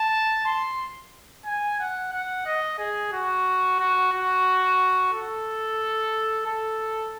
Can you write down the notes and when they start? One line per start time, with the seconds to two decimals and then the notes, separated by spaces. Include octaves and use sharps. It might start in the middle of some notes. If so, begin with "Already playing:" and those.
Already playing: A5
0.46 C6
1.46 G#5
1.80 F#5
2.13 F#5
2.46 D#5
2.79 G#4
3.13 F#4
3.79 F#4
4.13 F#4
5.13 A4
6.46 A4